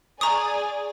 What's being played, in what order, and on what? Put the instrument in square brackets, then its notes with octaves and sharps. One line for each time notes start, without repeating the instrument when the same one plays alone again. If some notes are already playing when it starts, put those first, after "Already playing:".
[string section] G#4 D5 G#5 [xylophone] A#5 C#6 D#6